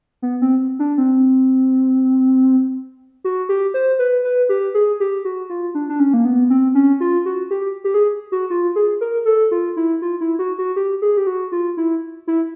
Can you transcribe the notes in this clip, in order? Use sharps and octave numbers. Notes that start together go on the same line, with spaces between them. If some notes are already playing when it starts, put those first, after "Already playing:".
B3
C4
D4
C4
F#4
G4
C5
B4
B4
G4
G#4
G4
F#4
F4
D4
D4
C#4
A#3
B3
C4
C#4
F4
F#4
G4
G4
G#4
F#4
F4
G#4
A#4
A4
F4
E4
F4
E4
F#4
F#4
G4
G#4
G4
F#4
F4
E4
E4